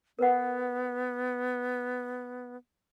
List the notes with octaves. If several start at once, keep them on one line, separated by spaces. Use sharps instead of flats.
B3 A#4 B4 F#5